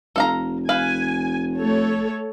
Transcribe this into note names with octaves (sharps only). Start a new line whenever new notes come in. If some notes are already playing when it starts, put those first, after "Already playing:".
F1 A4 F5 A#5
B4 F5 G#5
A3 A4 C#5